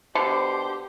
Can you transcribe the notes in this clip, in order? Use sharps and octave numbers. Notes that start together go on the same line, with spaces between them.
B2 D3 G4 C5